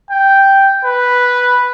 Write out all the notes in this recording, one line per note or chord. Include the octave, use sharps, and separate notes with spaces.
G5
B4